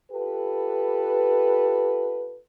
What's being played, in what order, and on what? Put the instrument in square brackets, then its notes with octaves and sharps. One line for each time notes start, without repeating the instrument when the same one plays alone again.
[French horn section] F4 G4 A4 B4